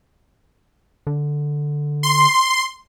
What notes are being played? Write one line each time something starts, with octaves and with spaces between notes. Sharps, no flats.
D3
C6